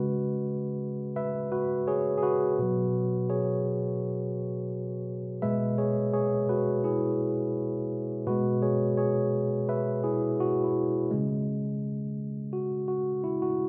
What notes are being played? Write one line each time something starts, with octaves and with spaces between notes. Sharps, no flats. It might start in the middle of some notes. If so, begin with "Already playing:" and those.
Already playing: C#3 G#3 F#4 B4
B4 E5
F#4 B4
G#4 C#5
G#4
F#4 B4
B2 F#3
G#4 C#5
B2 G#3 B4 E5
G#4 C#5
G#4 C#5
F#4 B4
E4 G#4
B2 G#3 F#4 B4
G#4 C#5
G#4 C#5
B4 E5
E4 G#4
F#4
E4
C#3 G#3
F#4
F#4
E4
F#4